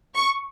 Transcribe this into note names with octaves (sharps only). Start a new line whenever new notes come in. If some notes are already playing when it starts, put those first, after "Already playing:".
C#6